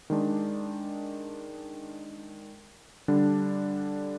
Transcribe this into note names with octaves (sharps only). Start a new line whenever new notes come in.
D#3 G#3 D4
D3 G3 D4